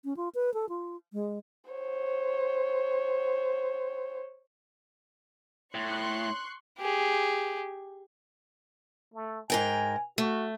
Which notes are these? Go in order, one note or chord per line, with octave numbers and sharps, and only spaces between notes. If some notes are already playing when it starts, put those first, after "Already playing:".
C#4
F4
B4
A4
F4
G#3
C5 C#5
A2 C6 C#6 F#6
G4 G#4
A3
G#2 A#4 G5 G#5
A3 F#4